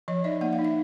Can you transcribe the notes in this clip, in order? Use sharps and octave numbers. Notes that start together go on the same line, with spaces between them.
F3 C#5 D#5
D#4 D5 E5
A#3 F#5
F5
D#4
E5